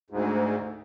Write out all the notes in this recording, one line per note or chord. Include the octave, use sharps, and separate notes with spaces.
D2 G#2